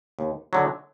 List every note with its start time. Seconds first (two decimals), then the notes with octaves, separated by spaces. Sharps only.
0.19 D#2
0.53 D3 F#3